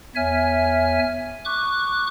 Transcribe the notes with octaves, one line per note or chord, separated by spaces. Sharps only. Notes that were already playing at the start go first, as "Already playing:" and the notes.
E2 C#5 E5 G#5 F6
C#6 D6 F#6